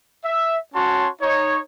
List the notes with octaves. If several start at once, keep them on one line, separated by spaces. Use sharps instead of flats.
E5
C#4 F#4 C#5 A5 C6
D#4 C#5